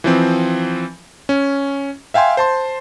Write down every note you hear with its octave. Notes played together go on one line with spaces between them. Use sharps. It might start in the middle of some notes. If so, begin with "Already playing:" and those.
E3 F3 C4
C#4
E5 F5 G5 G#5 C6
C5 A5 C6